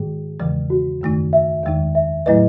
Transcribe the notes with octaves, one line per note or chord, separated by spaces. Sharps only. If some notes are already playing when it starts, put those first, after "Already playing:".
Already playing: G#2 D#3 G#3 G#4
E2 C#3 E3 G#3
F#4
F#2 D#3 A3 D#4
E5
E2 D#3 G#3 D#4
E5
A2 F#3 A3 E4 B4 D#5